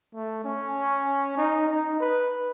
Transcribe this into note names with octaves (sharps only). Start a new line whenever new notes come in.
A3
C#4
D#4
D#4
B4